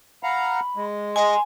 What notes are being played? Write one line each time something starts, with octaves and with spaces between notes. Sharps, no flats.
F5 F#5 A#5 B5
G#3
D#5 G#5 C6